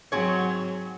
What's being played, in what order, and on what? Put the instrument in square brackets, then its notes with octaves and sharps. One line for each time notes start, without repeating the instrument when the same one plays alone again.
[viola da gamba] G#2 F#3 [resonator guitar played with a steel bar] C4 G#4 C#5